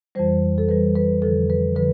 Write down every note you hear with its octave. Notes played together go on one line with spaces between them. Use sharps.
F2 E3 G3 C5
A4
F2 E3 G3 B4
B4
F2 D3 F3 A4
B4
D3 F3 B4